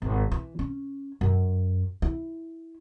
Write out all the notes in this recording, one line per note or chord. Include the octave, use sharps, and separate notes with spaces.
G#1
E3
C#4
F#2
E4